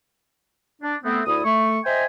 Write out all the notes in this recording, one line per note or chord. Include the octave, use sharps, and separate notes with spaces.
D4
A3 B3 C4
D2 E4 D5 D#6
A3 C#6
C5 D#5 E5 G5 G#5